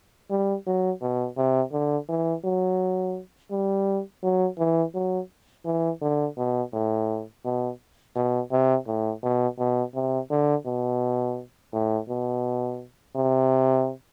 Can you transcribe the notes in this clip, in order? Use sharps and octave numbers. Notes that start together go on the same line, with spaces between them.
G3
F#3
B2
C3
D3
E3
F#3
G3
F#3
E3
F#3
E3
D3
B2
A2
B2
B2
C3
A2
B2
B2
C3
D3
B2
A2
B2
C3